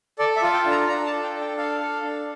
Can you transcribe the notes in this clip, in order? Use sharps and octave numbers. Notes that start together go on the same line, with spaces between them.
A4 D5
E5
F4
G5
D4
A#5
D4 A#5
A5
A4
G5
D4
G5
A4 F5
A4
D4